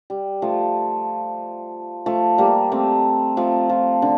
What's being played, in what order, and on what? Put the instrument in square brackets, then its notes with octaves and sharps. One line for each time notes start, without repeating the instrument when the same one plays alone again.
[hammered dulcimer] G3
F3 A3
F3 A3
G3 A#3
A3 C4
F3 A3
F3
D3